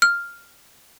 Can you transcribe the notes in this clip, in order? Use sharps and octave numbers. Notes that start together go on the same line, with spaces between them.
F6